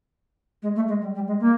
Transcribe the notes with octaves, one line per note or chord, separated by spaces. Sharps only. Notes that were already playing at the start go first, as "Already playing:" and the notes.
G#3
A3
G#3
G3
G3
G#3
A#3